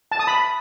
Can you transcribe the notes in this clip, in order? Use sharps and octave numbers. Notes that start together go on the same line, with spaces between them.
A5
D#6
B5